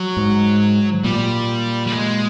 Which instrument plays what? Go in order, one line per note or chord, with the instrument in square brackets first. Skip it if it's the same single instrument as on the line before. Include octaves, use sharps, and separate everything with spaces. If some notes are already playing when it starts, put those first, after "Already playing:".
Already playing: [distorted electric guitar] F#3
[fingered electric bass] G#2
[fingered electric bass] A#2 [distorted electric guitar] G3
[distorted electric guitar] G3
G#3